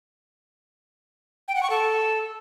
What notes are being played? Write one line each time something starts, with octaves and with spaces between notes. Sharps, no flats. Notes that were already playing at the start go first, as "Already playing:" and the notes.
G5
F#5
C#6
A4